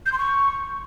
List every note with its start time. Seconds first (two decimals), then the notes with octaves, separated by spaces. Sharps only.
0.05 G6
0.12 C6
0.18 C#6